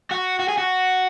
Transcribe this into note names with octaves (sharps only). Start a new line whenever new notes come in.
F#4
F#4
G#4
F#4